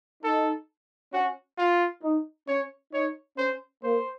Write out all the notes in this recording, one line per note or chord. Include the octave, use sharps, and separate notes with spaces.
D#4 A4
C#4 F#4
F4
D#4
C#4 C#5
D#4 C#5
C#4 C5
A#3 C5